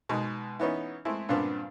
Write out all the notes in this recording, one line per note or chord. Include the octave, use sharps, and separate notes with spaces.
B2 G#3 D#4
E3 B3 C#4 D#4
G#3 A3 C4 E4
G2 A#2 C#3 B3 C4 D4